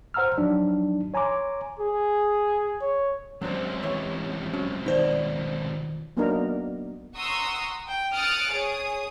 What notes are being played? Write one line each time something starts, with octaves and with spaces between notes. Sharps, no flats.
C5 F#5 A#5 E6 F6
F3 F#3 D4 D#4
C#5 G#5 A#5 C6 D6
G#4
C#5
C#2 C3 F#3 D4 C5
E3 C#5
F#3 C#4
B2 D#3 F3 D#4 C5 D5
F#3 A#3 B3 D4 D#4 A#4
F#5 A#5 C6 C#6 D#6 E6
G5
D#6 F6 F#6 A6 C#7 D7
G#4 C#5 D#6